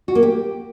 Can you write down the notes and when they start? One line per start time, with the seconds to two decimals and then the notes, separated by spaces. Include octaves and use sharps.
0.08 F#4
0.15 A#3
0.23 G4